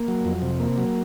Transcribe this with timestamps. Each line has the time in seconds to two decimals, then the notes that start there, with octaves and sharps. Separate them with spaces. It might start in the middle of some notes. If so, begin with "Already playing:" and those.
Already playing: A#3
0.08 F#3
0.25 F2
0.42 C3
0.60 A#3
0.78 F#3